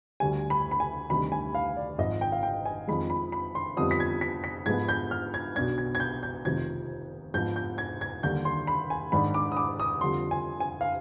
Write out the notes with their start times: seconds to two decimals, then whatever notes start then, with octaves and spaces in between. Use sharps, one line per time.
0.20 D2 D3 G3 G#5
0.50 B5
0.71 B5
0.80 G#5
1.10 D2 C3 D#3 G3 B5
1.32 G#5
1.55 F5
1.77 D5
1.98 G#1 G#2 F3 D#5
2.21 G5
2.32 F5
2.43 G5
2.66 G#5
2.88 F2 D#3 G#3 B5
3.10 B5
3.32 B5
3.55 C6
3.77 F2 D3 G3 B3 D#4 D#6
3.91 B6
4.00 G#6
4.21 B6
4.44 B6
4.66 G#2 F3 G#3 B3 G#6
4.89 G6
5.11 F6
5.34 G#6
5.55 B1 B2 B3 D4 G#6
5.78 G#6
5.95 G#6
6.00 G6
6.23 G6
6.45 F1 F2 C3 D#3 G#6
7.34 G#2 F3 B3 D#4 G6
7.56 G6
7.78 G#6
8.01 G#6
8.23 D#2 D3 G3 G6
8.45 C6
8.67 B5
8.90 G#5
9.12 G#2 D#3 G#3 D4 B5
9.34 D6
9.52 D#6
9.57 D6
9.80 D#6
10.01 F2 D3 G3 C6
10.31 G#5
10.60 G#5
10.81 F5